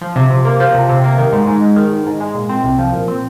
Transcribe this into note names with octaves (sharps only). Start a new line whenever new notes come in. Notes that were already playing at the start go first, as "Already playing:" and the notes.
F3
C3
C3
A#3
F3
C3
C3
A#3
D#3
G#2
G#2
G#3
D#3
G#2
G#2
G#3
A#2
C4
C2
F3
A#2
C4